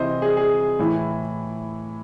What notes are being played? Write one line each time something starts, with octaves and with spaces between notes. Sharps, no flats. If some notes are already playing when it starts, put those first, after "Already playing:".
Already playing: C3 E3 C5 D#5
G#4
G#4
A2 E3